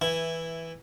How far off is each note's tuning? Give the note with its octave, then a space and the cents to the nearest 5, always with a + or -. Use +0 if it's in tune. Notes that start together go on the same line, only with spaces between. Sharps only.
E3 -5 E4 +5